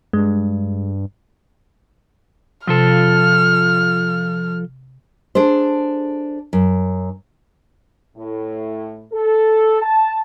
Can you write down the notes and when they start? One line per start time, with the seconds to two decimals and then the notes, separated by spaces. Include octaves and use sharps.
0.13 G2 G#3
2.68 C3 F3 F4 A4 F6
5.35 D4 G#4 A4 C5
6.53 F#2
8.16 A2
9.13 A4
9.82 A5